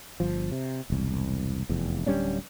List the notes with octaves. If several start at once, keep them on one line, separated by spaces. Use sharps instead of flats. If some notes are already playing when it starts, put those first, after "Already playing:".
G1 F3
C3
E1 C2
F1 E2
D1 G3 C#4 D4